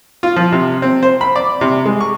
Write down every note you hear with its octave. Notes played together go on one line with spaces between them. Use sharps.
F4
F3
C3
C4
C5
B5
D5
C3
G#3
C#6